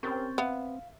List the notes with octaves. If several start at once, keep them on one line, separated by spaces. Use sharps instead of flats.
C4 C#4 G4 A#4 C#6 G6 A6
B3 E5 F5